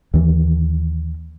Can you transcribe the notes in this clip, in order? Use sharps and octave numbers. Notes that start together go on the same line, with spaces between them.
D#2 E3